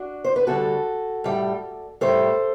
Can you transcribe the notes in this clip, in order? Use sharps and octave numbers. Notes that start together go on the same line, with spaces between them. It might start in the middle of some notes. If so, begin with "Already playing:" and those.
Already playing: D4 F#4
C5
B4
D2 D3 G3 F#4 A4
A2 G3
A2 G3 A4 C5